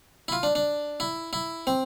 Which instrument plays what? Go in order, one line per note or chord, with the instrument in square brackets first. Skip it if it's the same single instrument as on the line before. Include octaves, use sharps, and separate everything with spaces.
[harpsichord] E4
F4
D4
D4
E4
E4
C4